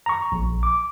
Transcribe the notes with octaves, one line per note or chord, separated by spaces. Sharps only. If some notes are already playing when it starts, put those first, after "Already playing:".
A#5 C#6
A#1
D6